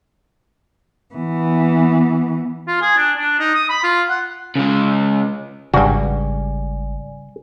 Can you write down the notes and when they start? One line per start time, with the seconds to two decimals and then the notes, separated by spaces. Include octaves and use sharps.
1.14 E3 B3
2.67 F4
2.81 G#4
2.97 D4
3.17 D4
3.39 D#4
3.55 D#6
3.69 B5
3.84 F4
4.09 F#5
4.55 C#3 G#3
5.74 G#1 G2 C#3 G3 F#4 D5 G#5